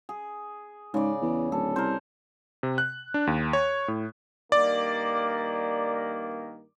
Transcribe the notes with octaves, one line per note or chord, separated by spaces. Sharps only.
G#4
G#2 C#3 D5
E2
D1 A4
C2 A#4 C5
C3
F#6
D4
D#2
C#5
A2
G2 D#3 A#3 D5